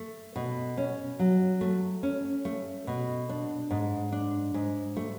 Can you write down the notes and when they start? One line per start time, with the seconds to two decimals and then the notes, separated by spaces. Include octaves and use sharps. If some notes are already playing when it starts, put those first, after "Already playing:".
Already playing: A3
0.36 B2
0.78 C#4
1.19 F#3
1.61 A3
2.03 C#4
2.45 A3
2.87 B2
3.29 D4
3.70 G#2
4.12 D4
4.54 G#2
4.97 A3